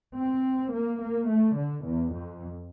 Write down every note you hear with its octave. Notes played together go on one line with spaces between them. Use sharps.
C4
A#3
A#3
A3
D3
E2
F2